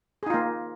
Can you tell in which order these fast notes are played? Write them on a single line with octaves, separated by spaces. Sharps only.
G#4 D#4 F4 A#3